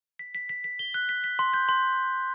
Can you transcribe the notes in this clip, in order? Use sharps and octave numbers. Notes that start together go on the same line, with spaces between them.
B6
B6
B6
B6
G7
F#6
B6
B6
C6
G6
C6